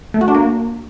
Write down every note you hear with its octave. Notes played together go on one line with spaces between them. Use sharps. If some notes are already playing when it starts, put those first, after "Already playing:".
A3
F#4
D4
A#3